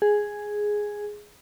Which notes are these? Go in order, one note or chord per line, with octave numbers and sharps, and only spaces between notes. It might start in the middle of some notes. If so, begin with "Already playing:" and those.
G#4